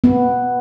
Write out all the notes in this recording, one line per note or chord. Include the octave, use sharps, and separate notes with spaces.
B3